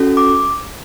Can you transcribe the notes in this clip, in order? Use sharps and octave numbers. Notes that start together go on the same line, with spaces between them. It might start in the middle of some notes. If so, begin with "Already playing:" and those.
Already playing: C#4 F#4 A4
D6